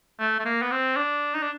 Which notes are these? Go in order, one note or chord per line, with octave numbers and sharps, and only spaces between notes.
A3
A3
A#3
B3
C4
D4
D#4
D4